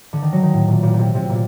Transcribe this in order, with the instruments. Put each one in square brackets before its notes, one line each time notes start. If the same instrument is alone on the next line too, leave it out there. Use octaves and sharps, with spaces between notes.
[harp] D3
D#3
F#3
D#3
A2
A#2
A#2
A#2
C3
C3
A#2